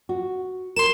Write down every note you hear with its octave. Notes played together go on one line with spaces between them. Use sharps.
F#4
A#4 C6 E7